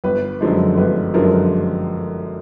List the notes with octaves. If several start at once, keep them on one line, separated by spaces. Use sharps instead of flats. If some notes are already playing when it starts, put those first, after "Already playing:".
G1 B4
F#2 D3 F3 G#3
G1 B4
F#2 D3 F3 G#3 A#4